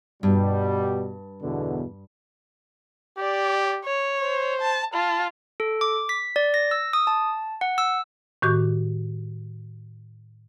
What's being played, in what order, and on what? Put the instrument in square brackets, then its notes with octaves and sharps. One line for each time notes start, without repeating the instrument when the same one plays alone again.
[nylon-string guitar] G2 [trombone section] B2 G3
[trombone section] E2 B2 D3
[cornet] G4 [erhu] D5
[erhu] C#5
[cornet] C5
[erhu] A5
[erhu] F4 [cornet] A5
[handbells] A4
D6
B6
D5
A#6
E6
D#6
A5
F#5
E6
[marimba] A2 D#3 F#4 G4 D6